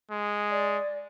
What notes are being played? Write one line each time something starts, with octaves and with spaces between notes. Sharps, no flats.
G#3
D5